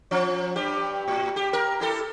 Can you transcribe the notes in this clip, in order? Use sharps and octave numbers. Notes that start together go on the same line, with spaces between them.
F3 C#4
G2 G4
A2
G4
A#4
E4 G4 A4